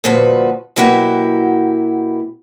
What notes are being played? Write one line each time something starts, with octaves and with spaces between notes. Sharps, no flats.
D2 G2 A#2 F3 F#4 B4
B2 F#3 A#3 E4 F#4 G4